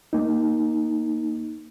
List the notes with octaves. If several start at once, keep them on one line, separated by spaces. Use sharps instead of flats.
A#3 D#4